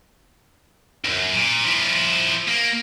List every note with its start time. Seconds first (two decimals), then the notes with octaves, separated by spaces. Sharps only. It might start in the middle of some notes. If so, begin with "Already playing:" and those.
1.05 B1 F#2
1.33 A#2
1.64 F3 E4
2.48 A#3